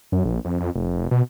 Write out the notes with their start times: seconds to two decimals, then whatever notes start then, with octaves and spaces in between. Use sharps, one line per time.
0.12 F#2
0.25 A#1
0.45 F2
0.60 F2
0.75 F1
1.11 B2